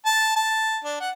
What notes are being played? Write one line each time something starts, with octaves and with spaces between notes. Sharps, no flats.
A5
A5
D4
F#5